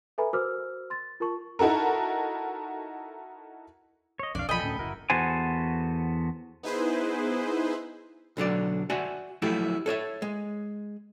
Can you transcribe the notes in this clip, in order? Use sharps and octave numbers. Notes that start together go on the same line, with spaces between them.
A4 B4 E5 G#5 A#5 B5
F#4 A#4 C5 D6 E6 F6
C6 A6
F4 A#4 A5 C#6
D#4 E4 F#4 A4 A#4
C#5 D#5
B1 F2 D4 D5 F5
B1 D3 F3 A4 D#5 G5 G#5 B5
D2 A2 C#4
F#1 F#2 E4 F#4 A#4
E2 B3 F#4 A4 C5 G#5
B3 D#4 E4 G#4 B4 C5
B1 D3 F#3 D5
F#4 D5 E5 G#5
F3 F#3 A3 E4 G4
A4 C#5 D5 E5
G#3